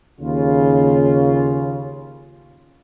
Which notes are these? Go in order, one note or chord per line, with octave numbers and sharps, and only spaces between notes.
D#2 C#3 F4